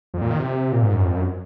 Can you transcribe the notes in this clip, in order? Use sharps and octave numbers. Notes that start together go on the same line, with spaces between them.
F2
A#2
D#3
C3
A#2
G#2
F#2
F2
F#2